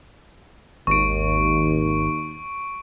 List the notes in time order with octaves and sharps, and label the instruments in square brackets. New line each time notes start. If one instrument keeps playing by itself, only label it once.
[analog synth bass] G#1 [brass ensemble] D#2 [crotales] C#6 D7